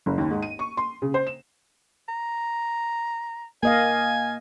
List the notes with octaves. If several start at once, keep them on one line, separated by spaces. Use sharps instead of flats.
F#1
D#2
G#2
D#7
C#6
C6
C#3
C5
E7
A#5
A#3 D#5 F5 G#5